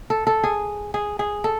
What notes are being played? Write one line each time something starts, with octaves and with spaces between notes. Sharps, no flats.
A4
A4
G#4
G#4
G#4
A4